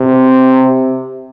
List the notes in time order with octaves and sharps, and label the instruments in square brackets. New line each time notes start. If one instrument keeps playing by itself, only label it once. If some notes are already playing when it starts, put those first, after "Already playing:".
Already playing: [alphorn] C3